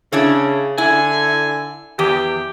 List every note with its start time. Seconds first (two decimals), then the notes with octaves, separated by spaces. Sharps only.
0.12 C#3 D4 E4 C#5
0.78 D3 E4 G#5
1.99 E2 G4